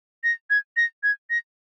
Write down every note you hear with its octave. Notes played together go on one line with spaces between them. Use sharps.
A#6
G#6
A#6
G#6
A#6